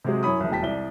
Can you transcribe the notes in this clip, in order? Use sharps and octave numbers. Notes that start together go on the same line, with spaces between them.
C3 F#3 G#3 C4 G#4
F#2 E4 C#5 B5 D#6
F#1 C2
E1 G5 A5 B6
C2 D5 G7